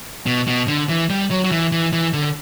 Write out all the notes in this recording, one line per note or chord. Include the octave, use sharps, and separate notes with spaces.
B2
B2
D3
E3
G3
F#3
F#3
E3
E3
E3
D3